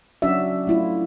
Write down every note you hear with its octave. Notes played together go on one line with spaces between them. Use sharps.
F#3 C#4 D4 F#4 D5 E5
A3 E4 F4